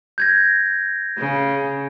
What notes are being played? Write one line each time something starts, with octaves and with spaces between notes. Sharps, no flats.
G6 G#6 A#6
C#3